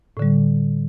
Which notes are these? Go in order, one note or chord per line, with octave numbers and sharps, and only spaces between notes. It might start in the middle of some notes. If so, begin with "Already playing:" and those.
A2 D3 G3